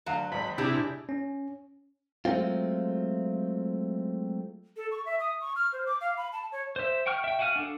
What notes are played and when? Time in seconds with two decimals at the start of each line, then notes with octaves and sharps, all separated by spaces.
0.06 D2 F#3 F5
0.32 G#1 B5
0.58 C3 D4 E4 G4 G#4
1.09 C#4
2.25 F#3 G#3 A3 C4 F4
4.76 A4
4.91 C#6
5.05 E5
5.20 D#6
5.41 C#6
5.56 F6
5.73 C5
5.86 D6
6.01 F5
6.17 B5
6.33 A5
6.52 C#5
6.76 C5 E5
7.06 F#5 G5 C#6 F6
7.24 E5 G5
7.39 F#4 F5 F#5 G#5 F6
7.56 D4 A4